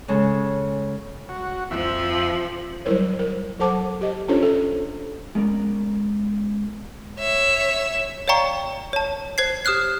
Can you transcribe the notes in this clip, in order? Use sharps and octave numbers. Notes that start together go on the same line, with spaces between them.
C#3 G#3 G#4 A4
F#4
F2 F3 E5
F#3 G3 E4 A#4 C5 C#5
A#4
F#3 A4 C5 F#5 A5 D6
G4 D#5
C#4 D4 F4 A4 C5 C#5
A4
G#3 B3 C#4 A#4 D5
C#5 E5
C#5 D5 F5 G5 A#5 C#6
C#5 A5
C5 G#6 C7
G4 D#6 F6 F#6 C7